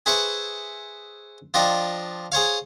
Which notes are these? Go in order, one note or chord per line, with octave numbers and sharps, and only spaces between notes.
G#4 B4 C5 E5 B5 C#6
F3 D4 F4 D#5 G5
G#4 C5 C#5 F5